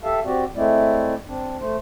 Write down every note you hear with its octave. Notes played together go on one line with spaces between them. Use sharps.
G4 A4 E5 F5 A5
C4 F#4 G4 D5
G#3 A3 C4 E4 D5
C4 D4
A3 C5